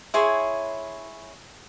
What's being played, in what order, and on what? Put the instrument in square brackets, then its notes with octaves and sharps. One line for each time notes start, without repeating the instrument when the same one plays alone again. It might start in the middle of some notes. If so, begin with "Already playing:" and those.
[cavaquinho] E4 G#4 C#5 C6